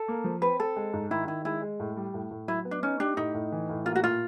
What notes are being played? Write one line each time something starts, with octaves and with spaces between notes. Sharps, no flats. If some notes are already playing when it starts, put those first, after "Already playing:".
Already playing: A4
A#3
F3
C4 B4
C4 A4
G#3
G#2
D#3 E4
D#3 E4
G#3 E4
G#3
A2
G3
A2
A2
F#3 E4
B3
D4
C#4 D#4
D4 G4
A2 D#4
A2
E3
A2
A#3 F4
F#4
A#2 F4